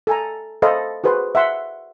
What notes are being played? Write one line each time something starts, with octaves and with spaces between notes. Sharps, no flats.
A4 G#5 A#5
A4 C5 D#5 F5 B5
F#4 G#4 B4 C5
E5 F#5 C6